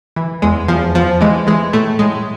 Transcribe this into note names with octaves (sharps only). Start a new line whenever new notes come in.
E3
E2 G#3
E2 F3
E2 F3
E3 G#3
E3 G#3
A2 A3
A2 G#3